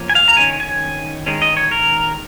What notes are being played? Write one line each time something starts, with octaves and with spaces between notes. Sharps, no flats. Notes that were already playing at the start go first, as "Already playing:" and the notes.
Already playing: F3 A#3 C#4
G#5
F5
A#5
D#3 C#4 G#5
G#5
D#3 G#3 C#4
D#5
C#5
A#4